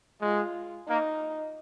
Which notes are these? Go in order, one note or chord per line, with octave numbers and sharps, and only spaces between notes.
G#3 F4
A#3 D#4